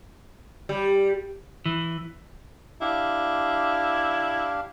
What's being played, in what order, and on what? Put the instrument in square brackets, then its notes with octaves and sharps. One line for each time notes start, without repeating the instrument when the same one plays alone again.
[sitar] G3
[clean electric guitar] E3
[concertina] D4 G4 F5 [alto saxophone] E4